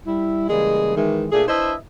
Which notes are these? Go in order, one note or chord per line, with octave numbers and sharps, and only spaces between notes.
G3 E4
C#3 E3 G3 G#3 A#3 G#4
D#3 E3 G#3
A#2 A3 D4 G#4
D4 E4 B4 C5 D#5 E5